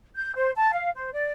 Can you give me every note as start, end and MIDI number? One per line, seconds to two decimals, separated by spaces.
0.16 0.34 91
0.36 0.52 72
0.57 0.72 81
0.72 0.90 77
0.96 1.11 72
1.13 1.32 74